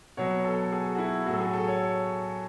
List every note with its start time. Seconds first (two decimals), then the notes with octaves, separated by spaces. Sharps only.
0.17 B2 F#3 C#5
0.44 A4
0.72 G#4
0.95 F#4
0.98 E4
1.26 A2 F#3 F#4
1.34 A4
1.40 G#4
1.53 A4
1.67 C#5